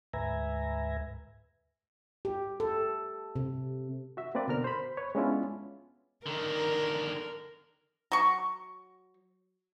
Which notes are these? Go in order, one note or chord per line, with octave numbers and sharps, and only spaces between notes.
D2 G#2 B4 E5 G#5 A#5
G4
A4
C3
F#4 E5
A#3 C4 B4 D5
B2 D3 A#4 F6
C5 B5
B4 C#5
G#3 B3 C#4 D4 E4 F4
D3 D#3 A#4
F#3 C#6